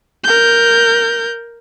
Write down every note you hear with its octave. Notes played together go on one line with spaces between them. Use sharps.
A#4 G6